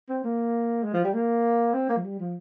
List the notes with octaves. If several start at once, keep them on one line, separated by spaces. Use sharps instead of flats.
C4
A#3
G#3
F3
G3
A#3
C4
A#3
F3
G3
F3